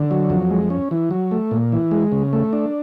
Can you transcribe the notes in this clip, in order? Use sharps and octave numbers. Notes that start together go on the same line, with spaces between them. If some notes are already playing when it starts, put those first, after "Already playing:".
Already playing: D3
F#3
F2
G#3
C#4
E3
F#3
A3
A#2
E3
G#3
C#3
A3
D4